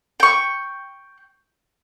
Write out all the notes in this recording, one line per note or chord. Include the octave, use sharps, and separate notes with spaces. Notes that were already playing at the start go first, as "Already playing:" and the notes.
G5 C#6